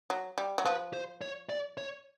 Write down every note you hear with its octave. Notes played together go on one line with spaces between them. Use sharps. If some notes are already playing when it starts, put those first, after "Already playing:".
F#3
G3
F#3
F3 B4
C5
C#5
D5
C#5